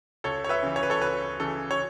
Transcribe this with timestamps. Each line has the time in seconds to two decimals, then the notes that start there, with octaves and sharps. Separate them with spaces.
0.24 C#2 A4 C#5
0.44 C#5
0.49 B4 E5
0.63 C#3 E3
0.76 C#5
0.83 B4
0.90 A4 C#5
1.01 C#2 B4
1.40 C#3 E3 A4
1.71 C#5